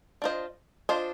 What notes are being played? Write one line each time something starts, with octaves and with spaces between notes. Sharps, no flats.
D4 F4 C5 D#5
D4 F4 C5 D#5